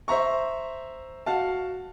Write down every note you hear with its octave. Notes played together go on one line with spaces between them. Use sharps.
C5 E5 A#5 C#6
F#4 F5 A5